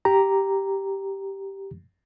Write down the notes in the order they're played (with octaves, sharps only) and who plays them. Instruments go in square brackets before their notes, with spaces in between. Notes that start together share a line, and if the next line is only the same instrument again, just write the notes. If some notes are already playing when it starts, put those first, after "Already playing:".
[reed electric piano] G4 A#5